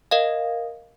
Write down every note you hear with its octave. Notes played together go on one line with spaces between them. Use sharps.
A#4 D#5 F5